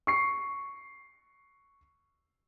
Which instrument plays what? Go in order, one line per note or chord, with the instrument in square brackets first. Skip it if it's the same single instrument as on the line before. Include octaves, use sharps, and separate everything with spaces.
[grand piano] C#6 C7